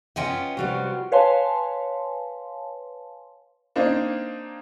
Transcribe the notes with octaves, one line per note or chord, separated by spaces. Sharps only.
B3 C#4 F4 D#5 G5 G#5
C3 G3 F#4 G4
B4 C#5 F5 G#5 A5 C6
A#3 C4 D4 D#4